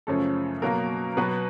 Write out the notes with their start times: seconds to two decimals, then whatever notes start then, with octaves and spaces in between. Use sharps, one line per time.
0.07 F#2 C#3 F3 A3 C#4 A4
0.62 B2 F#3 A#3 A#4
1.17 B2 F#3 B3 B4